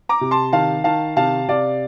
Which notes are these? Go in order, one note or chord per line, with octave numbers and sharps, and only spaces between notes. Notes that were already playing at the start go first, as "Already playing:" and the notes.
A#5 D6
C3
A5 C6
D#3 F5 A5
D#3 F5 A5
C3 F5 A5
C3 D5 F5